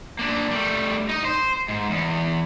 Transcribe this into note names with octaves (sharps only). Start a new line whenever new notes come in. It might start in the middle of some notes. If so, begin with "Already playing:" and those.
A#3 D4
G3 A3
D#4 D#5
C5
G#2
E2